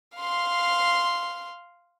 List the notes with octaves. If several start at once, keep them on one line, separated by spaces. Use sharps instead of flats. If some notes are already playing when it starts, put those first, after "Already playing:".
F5 C6